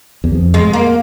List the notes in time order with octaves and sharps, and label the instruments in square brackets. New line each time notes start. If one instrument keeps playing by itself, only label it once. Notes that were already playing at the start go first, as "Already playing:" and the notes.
[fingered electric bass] E2
F2
[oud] G#3
A#3